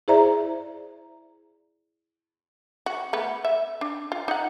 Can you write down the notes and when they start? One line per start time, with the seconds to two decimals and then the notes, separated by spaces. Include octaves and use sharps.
0.08 E4 G#4 C5 D5 E5 A#5
2.86 F#4
3.13 A3 B3
3.45 E5
3.81 D4
4.12 F4
4.28 D#4 F#5